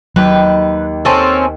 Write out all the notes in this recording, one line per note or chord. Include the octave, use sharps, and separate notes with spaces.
D#2 F#3 G4 B4
C4 C#4 A4